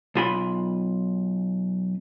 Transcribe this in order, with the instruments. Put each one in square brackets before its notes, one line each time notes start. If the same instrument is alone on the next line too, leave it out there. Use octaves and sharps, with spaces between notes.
[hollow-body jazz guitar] B1 F4 B5